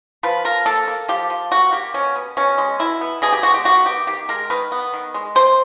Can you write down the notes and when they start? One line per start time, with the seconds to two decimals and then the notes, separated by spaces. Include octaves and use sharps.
0.23 F3 B4
0.45 F3 A#4
0.66 A#3 A4
0.88 A#3
1.08 F3 G4
1.30 F3
1.51 A#3 F#4
1.72 A#3 G4
1.94 B2 C#4
2.15 B3
2.37 B2 C#4
2.58 G#3
2.79 B2 E4
3.01 B3
3.22 B2 G#4
3.33 G4
3.43 G#3 F#4
3.54 G4
3.65 D#3 F#4
3.86 B3 G4
4.07 D#3 G4
4.29 G#3 A#4
4.50 D#3 B4
4.72 B3
4.93 D#3
5.14 G#3
5.35 C3 C5